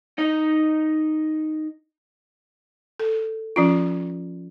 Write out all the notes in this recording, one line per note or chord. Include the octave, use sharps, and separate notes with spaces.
D#4 D#5
A4
F3 C#4 F4